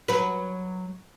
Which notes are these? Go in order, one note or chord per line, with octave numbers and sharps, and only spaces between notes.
F#3 B4